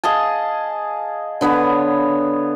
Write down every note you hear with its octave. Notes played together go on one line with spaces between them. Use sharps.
G#4 D#5 F5 A5
D3 B3 B4 C#5